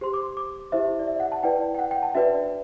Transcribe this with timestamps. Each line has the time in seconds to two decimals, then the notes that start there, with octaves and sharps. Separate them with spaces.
0.01 G4 C5 C6
0.14 D6
0.37 D6
0.72 E4 G4 C5 E5
0.99 D5
1.07 E5
1.20 F#5
1.32 A5
1.43 E4 B4 D5 G5
1.75 G5
1.79 F#5
1.91 G5
2.03 A5
2.15 D4 F#4 B4 D5 E5